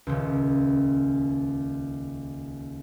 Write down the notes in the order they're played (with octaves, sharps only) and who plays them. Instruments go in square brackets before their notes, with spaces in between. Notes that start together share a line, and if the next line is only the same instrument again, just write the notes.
[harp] D#1 C#2